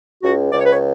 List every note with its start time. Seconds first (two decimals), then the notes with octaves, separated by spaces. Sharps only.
0.23 C#2 F#4
0.51 C#2 D5
0.59 C#5
0.66 B4
0.73 C#5